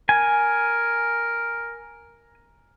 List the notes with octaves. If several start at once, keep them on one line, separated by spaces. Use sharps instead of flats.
A#4 G#5